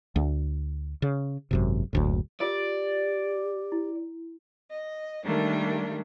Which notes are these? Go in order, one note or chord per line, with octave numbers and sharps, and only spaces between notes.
D2
C#3
G#1 F#2 C3
F#1 D2 A2
F4 G4 A#4 D5
E4
D#5
D#3 G3 A3 A#3 D4